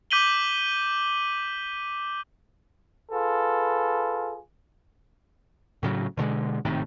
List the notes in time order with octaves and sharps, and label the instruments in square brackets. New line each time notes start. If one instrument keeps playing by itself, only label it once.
[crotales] D6 G6 B6 D#7 F#7 G7
[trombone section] F4 G#4 A4 B4
[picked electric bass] A2 C#3 F#3
B2 D3 F#3 G#3
G#1 A2 C3 D#3